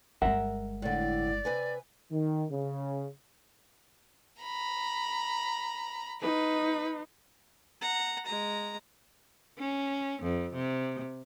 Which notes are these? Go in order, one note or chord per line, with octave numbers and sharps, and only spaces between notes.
G1 G#3 A#4 E5 F#5
A2 D3 D5
C3 B4 G#5
D#3
C#3
A#5 B5
D#4 B4
F#5 A#5
G#3 A#5
C#4
F2
C3